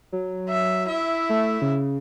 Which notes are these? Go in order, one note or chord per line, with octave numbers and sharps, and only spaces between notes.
F#3
E5
E4 E5
A3
C#3